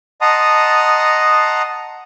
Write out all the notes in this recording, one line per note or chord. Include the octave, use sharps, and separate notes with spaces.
D#5 F#5 A5 A#5 C6 D#6